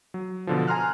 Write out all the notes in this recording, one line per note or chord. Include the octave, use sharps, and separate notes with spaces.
F#3
B2 D3 F3
G#5 A#5 C6 F6 F#6